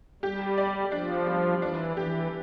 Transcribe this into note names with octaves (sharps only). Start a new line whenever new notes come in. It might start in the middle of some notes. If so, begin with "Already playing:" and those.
G3 G4
D5
F3 D4
G3
E3 D4
E3 G4